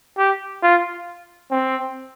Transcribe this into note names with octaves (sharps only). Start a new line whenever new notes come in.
G4
F4
C4